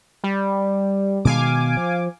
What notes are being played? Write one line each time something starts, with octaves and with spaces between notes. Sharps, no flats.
G3
B2 D#3 G#3 F5 G#5 D6
F3